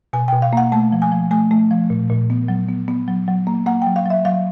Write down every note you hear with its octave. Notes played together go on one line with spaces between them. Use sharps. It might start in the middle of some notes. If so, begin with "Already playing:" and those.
B2 G#5
G5
B2
F5
A#3 F#5
A3 A5
F3
G#5
F3
A3 G#5
A3
F3
A#2
A#2
B3
F#3
B3
B3
F#3
F#3
A#3
A#3 F#5
G5
F#3
F5
F#3 E5
F#3 F5